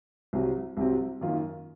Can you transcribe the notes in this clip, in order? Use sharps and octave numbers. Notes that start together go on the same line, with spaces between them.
C2 C3 F#3 C4
C2 C3 F#3 C4
F#2 D#3 A#3 F4